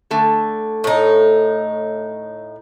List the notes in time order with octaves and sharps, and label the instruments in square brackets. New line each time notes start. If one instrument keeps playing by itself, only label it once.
[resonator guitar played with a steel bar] D3 A3 A4
[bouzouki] A2 D#4